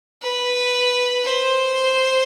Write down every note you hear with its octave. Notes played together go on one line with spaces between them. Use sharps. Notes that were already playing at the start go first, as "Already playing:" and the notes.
B4
C5